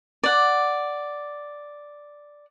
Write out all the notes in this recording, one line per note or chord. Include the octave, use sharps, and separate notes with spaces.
D5 F#5